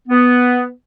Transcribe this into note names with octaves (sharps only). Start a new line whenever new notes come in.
B3